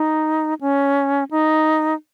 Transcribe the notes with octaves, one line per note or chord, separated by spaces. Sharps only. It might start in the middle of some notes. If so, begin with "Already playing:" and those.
Already playing: D#4
C#4
D#4